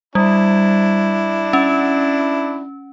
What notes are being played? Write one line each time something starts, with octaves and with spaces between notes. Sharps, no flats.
G3 D4 E4
C#4